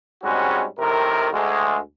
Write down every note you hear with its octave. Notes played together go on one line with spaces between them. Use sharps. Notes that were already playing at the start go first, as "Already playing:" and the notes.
G#2 G3 G#3 C4 C#4 F#4
A2 C3 D#3 A#4
D2 G#3